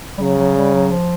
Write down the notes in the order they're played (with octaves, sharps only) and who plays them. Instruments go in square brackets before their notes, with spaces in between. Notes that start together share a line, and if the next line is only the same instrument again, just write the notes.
[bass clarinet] G3
[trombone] C#3 [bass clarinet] F#3
[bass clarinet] F#3
G3
F#3
F3